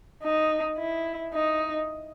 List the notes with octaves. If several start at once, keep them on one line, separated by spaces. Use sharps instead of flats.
D#4
E4
D#4